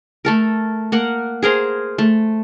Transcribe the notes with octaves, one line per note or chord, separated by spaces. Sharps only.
A3 A4 A#4
A#3 A#4 F#5
G#4 A#4 C5 A#5
A3